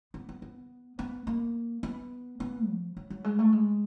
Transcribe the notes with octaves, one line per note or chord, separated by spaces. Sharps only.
B3
B3
B3
B3
A#3
B3
B3
F3
F#3
F#3
G#3
A3
G#3